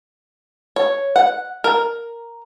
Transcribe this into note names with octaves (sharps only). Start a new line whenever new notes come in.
C#5
F#5
A#4